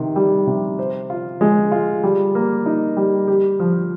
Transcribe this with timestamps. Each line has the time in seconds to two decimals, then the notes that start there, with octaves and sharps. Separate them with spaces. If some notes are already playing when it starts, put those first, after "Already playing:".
Already playing: C3 D#3
0.16 G3
0.47 C3
0.79 C5
1.10 F4
1.41 G#3
1.72 F4
2.03 G3
2.35 A#3
2.66 D#4
2.97 G3
3.28 G4
3.60 F3